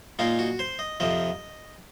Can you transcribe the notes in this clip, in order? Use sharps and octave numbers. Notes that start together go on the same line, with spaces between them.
A#2 G#3 D#4 F4
F#4
C5
D#5
F2 C3 F3 D#5